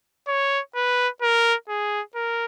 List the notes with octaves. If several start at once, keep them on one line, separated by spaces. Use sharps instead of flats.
C#5
B4
A#4
G#4
A#4